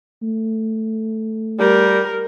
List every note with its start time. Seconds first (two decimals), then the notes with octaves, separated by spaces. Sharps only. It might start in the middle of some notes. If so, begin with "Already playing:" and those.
0.22 A3
1.60 G3 A#4